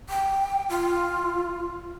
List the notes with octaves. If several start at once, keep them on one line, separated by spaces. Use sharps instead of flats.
G5
F4